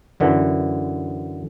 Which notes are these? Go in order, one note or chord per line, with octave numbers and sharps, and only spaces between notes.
F#2 D3 E3